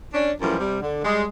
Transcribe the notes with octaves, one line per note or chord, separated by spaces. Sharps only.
C#4 D4
F#2 A2 E3 F3 G3
C3 G3
D3
G3 G#3